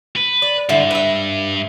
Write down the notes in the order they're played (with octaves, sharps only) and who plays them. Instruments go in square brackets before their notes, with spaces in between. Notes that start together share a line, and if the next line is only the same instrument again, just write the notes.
[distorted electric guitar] B4
[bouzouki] D5
[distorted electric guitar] G2 [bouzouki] D3 E4
[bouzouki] B4 E5